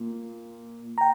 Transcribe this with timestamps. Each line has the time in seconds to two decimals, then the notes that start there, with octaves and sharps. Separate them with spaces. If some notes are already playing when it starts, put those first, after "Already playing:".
0.01 A#2
0.98 G5 A#5